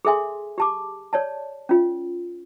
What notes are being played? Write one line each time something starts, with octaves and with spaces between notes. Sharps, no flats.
G#4 A4 E5 G#5 C6
G4 A5 D6
C#5 D5 A5
C#4 F4